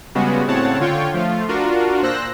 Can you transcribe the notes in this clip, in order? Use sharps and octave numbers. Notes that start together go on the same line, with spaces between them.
C#3 G3 G#3 B3 F#4
A2 C#3 C4 C#5 F#5 A5
D3 F4 C#5 G5
F3 A3 F4
D4 F4 F#4 A#4
A#2 C5 E6 F#6 A#6